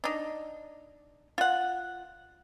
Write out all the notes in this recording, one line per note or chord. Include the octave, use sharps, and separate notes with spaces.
D4 D#4
F4 F#5